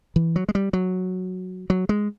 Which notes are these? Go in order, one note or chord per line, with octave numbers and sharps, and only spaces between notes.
E3
F#3
G#3
G3
F#3
F#3
G#3